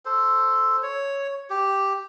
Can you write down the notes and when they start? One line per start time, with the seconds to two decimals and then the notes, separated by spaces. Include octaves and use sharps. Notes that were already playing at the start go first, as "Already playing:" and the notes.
0.05 A4 C5
0.83 C#5
1.50 G4